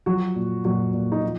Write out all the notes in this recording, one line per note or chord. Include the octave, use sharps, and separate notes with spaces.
F3 F#3 F#4
A#2
A#2 F#3 F#4
A#2
D#4
F3